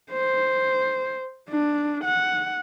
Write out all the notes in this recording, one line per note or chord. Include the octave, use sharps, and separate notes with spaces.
C5
D4
F#5